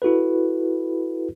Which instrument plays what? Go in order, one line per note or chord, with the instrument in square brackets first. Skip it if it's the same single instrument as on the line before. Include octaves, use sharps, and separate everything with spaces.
[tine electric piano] E4 F#4 A4 B4